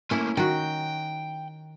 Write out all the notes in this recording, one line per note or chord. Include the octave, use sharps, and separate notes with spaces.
A3 A#3 C#4 E4
D#3 F#4 G5